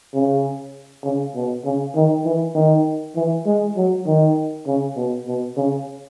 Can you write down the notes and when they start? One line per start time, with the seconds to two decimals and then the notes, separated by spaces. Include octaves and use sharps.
0.14 C#3
1.04 C#3
1.35 B2
1.65 C#3
1.95 D#3
2.25 E3
2.55 D#3
3.16 E3
3.46 G#3
3.76 F#3
4.06 D#3
4.66 C#3
4.96 B2
5.27 B2
5.57 C#3